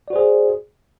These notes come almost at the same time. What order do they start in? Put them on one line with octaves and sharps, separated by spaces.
D5 F#4 C5 G#4